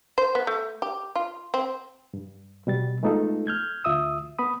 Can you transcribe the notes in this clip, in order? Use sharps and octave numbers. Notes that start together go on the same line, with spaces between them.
C5
B3
A3
G4
F4
C4
G2
B2 G3 A6
G#3 A3 B3 D#4 F4 A4
F6 G6 G#6
D2 F4 E5 D#6 E6
B3 B5 D#6